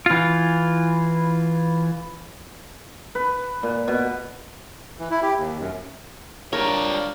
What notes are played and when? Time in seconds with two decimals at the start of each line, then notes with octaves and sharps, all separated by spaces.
0.06 E3 F4
3.15 B4
3.63 A#2
3.88 B2
4.99 E3
5.11 E4
5.22 G4
5.37 D#2
5.60 F#2
6.53 G3 D4 F4 A#4 C#5